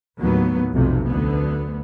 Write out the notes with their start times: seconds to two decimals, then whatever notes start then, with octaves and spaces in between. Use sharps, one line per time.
0.18 D#2 A2 F#3 B3
0.74 F1 B1 F2 C3
1.06 D2 D3 B3